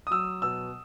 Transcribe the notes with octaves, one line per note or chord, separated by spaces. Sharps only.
D#6
F#3 E6
B2 E6